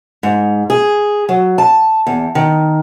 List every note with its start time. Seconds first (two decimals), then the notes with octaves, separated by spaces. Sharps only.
0.23 G#2
0.70 G#4
1.29 F#3
1.58 A5
2.07 E2
2.35 D#3